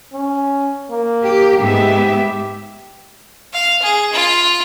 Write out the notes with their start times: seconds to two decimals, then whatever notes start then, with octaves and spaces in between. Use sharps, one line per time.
0.13 C#4
0.91 A#3
1.23 G4
1.58 G#2 B3 G4 E5
3.54 F5
3.82 G#4
4.13 F4